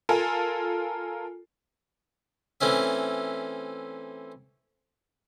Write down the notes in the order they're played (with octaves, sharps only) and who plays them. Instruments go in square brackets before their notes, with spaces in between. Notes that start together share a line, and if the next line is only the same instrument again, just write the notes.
[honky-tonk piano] F4 A4 A#4 G#5
[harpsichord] E3 A3 C4 C#4 E5